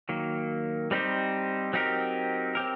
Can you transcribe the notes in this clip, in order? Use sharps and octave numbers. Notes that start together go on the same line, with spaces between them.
D#3 F#3 A#3
G3 C4 D#4 G4 C5
F#3 C4 D#4 G4 A#4
C4 G4 A#4